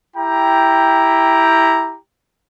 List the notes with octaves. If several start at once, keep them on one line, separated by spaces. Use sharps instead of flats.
E4 G4 G5 A#5